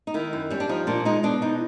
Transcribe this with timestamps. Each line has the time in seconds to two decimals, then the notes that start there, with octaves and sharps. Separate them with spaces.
0.07 D#4
0.14 D#3 E4
0.33 F#2
0.51 G3 C#4
0.60 D4
0.69 F3 D#4
0.87 A#2 D4
1.05 G#3 D#4
1.23 B2 D4
1.42 E2 D#4